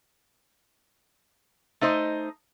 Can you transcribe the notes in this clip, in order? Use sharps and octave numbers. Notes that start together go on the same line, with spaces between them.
A3 D#4 C5 D#5